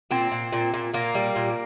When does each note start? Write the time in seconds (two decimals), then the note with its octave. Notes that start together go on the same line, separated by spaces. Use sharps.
0.11 A#2 C4
0.31 A#2
0.52 A#2
0.74 A#2
0.93 A#2 A#3
1.15 G3
1.36 A#2